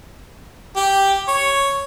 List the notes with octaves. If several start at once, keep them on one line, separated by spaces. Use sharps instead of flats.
G4
C#5